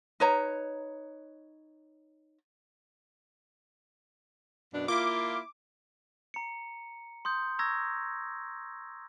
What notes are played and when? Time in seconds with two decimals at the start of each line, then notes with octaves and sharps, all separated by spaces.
0.20 D#4 B4 C#5 A#5
4.73 F#2 B2 D4
4.88 A#3 E4 F4 D6
6.34 A#5 C#7
7.25 C6 D#6 G6
7.59 A#5 C#6 E6 G#6 A#6